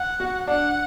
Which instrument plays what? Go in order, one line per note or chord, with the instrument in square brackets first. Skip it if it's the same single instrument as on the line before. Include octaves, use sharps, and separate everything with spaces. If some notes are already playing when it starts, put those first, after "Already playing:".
Already playing: [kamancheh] F#5
[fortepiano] F#4
[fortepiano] D4 [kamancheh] F#5